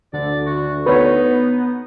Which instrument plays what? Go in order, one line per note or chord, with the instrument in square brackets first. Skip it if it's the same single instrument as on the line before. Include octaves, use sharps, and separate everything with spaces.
[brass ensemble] D2 [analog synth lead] D3 [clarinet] D5
[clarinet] F#4
[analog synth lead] B3 [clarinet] D#4 [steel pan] B4 C#5